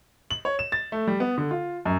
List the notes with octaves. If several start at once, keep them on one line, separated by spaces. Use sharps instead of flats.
F#7
C#5
E7
A6
A3
G3
B3
D3
F4
F#2